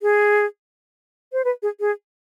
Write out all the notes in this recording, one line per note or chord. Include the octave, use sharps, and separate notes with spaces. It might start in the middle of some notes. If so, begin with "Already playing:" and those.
G#4
C5
B4
G#4
G#4